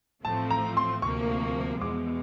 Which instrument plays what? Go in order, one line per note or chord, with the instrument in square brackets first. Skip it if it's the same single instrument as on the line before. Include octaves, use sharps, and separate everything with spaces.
[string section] A1 A2 F3 A3 C4 [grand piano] A5
[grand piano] A#5
C6
[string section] D2 C3 F3 A#3 [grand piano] C#6
[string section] E2 B2 G#3 [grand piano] D6